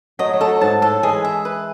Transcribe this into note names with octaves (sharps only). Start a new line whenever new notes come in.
F#3 A3 D#5
F#3 A3
A4
F#3
G#2 A5
A2 A4
E3 G#3 G#4
E5
B4